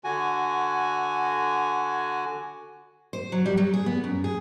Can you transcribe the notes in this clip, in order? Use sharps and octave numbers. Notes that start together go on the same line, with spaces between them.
D3 F#4 G#5
C5
F#3
G3
F#3
G#4
B3
F#2
G#4